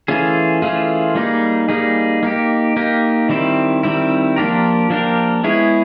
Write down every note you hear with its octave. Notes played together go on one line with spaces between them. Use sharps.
E3 A3 C#4 F4 G#4
E3 A3 C#4 F4 G#4
G3 A#3 D#4 G#4
G3 A#3 D#4 G#4
A#3 D#4 G4
A#3 D#4 G4
D#3 G3 C4 E4
D#3 G3 C4 E4
F3 A#3 D4 G4 A#4
F3 A#3 D4 G4 A#4
G#3 B3 E4 G#4 C#5